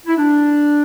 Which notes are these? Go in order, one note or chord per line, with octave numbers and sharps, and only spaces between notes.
E4
D4